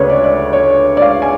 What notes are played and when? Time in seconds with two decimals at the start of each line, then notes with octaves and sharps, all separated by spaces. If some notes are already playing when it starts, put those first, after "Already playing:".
Already playing: D2 C#3 G#3 D4 B4 C#5
0.10 D5
0.24 D5
0.53 C#5
0.97 D5
1.02 F5
1.22 G#5